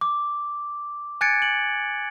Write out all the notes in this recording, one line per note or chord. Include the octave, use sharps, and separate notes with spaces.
D6
G#5 F#6 G#6 A6 C#7 D7
D7 F#7